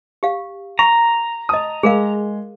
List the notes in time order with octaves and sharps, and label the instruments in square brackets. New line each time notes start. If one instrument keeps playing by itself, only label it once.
[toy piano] G4 F5
[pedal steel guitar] A#5 [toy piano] C#6
[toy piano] D#5 A5 [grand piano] D#6
[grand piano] G#3 [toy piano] G#4 A#4 F5